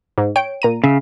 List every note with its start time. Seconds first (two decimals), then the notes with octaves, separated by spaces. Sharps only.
0.18 G#2
0.36 C#5 G5 D7
0.62 A#2 A#5 D#7
0.84 C#3 E5